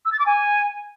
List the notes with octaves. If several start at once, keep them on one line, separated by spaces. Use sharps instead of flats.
E6
A6
D6
G#5